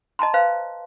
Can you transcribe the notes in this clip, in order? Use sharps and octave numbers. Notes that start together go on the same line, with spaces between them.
D#5 A5 A#5 C6
B4 C5 F5